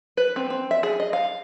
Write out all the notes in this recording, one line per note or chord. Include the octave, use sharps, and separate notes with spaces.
B4
C4
C4
E5
G#4
D#5
F5